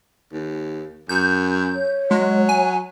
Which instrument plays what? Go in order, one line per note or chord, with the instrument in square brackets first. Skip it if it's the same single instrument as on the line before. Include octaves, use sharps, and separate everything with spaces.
[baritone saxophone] D#2
[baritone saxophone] F#2 [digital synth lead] G6
[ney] C#5
[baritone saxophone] F#3 [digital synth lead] G#3
[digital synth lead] G#5